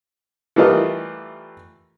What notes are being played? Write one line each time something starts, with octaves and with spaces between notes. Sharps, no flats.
E3 G3 A3 F4 A#4 D#5